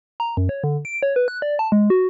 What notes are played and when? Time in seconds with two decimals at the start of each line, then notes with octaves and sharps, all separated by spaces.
0.20 A#5
0.37 F#2
0.49 C#5
0.64 D3
0.85 D7
1.03 C#5
1.16 B4
1.28 F#6
1.42 D5
1.59 A5
1.72 G#3
1.90 F#4